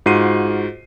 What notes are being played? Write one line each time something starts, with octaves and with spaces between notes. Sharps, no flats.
G#2 F4 F#4 C7 D#7